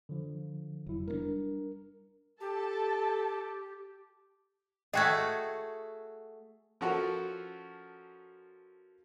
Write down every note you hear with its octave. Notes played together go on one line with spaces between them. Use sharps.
D3 F3
F1 F#3 E4
G3 B3 D4 A#4
G4 A4 A5
A3 F#4 G#4 D#5 G5 G#6
F3 C#4 F4 F#4 A4 A#4